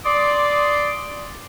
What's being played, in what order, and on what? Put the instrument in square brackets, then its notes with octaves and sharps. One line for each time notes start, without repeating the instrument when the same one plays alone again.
[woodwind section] D5 C6 D6 D#6